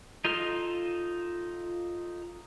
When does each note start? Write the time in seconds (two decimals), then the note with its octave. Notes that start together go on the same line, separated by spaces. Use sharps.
0.25 D#4 F4 A4 F6